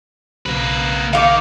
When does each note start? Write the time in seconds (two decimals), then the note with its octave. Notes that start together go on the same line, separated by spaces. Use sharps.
0.46 B1 C#3 A#3 B4
1.13 D#3 F5 D6